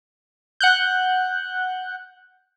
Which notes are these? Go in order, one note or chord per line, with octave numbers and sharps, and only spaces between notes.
F#5 F#6 G6